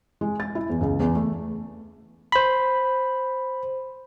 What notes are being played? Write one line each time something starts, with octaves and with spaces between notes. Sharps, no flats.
G#3
A6
E4
E2
C#2
E2
A3
C5 B5